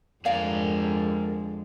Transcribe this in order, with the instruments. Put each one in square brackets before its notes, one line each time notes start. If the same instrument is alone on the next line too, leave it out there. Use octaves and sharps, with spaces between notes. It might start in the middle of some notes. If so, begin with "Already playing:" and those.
[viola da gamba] F2 D3 G#3 [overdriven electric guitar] G#4 A#4 [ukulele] D5 F5